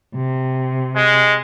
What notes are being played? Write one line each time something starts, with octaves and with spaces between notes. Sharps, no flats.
C3
G#3